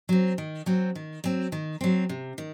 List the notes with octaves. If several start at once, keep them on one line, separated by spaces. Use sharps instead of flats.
F#3 C4
D#3
F#3 C4
D#3
F#3 C4
D#3
F#3 C4
C3
D#3